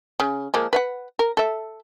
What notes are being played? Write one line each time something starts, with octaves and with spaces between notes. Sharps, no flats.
C#3
F3 G#3 A#3
B4 F5 F#5
A#4
A4 E5